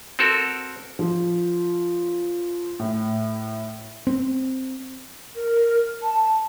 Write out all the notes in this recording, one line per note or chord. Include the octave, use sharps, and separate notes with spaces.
C4 F#4 A4 A#4
F3
A2
C4
A#4
A5